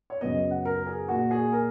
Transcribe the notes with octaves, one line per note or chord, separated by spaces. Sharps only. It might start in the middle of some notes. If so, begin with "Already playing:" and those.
C#5
F#2 C#3 F#3 B3 D#5
F#5
A#4
G#4
A#2 A#3 F#4
G#4
A#4